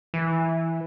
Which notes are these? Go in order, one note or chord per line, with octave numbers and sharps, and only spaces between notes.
E3